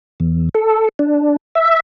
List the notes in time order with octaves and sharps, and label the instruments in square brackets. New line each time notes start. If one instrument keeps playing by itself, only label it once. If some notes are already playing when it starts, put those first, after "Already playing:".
[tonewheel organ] E2
A4
D4
E5